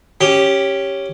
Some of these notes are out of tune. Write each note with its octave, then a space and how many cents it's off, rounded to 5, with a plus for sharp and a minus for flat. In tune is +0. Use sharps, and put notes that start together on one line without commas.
C#4 +0 G4 +0